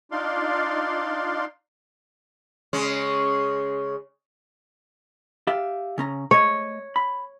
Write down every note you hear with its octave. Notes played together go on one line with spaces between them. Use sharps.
D4 D#4 F4 D5 F5 C6
C#3 G#3 C#4
G4 E5 F5
C#3 C#4 A#5
A3 C#5 D#5
B5